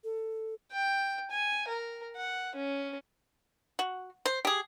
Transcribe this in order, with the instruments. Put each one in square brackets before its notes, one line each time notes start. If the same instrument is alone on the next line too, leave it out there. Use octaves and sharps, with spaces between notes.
[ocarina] A4
[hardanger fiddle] G5
G#5
A#4
F#5
C#4
[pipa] F#4
C5
G4 G#4